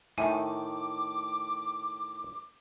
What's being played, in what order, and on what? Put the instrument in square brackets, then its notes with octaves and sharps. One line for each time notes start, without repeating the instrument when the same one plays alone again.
[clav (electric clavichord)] A2 D#3 [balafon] E5 [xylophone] G#5 [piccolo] D6